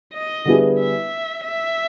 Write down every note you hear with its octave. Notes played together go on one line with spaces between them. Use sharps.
D#5
D3 G3 B3 E4 G#4
E5
E5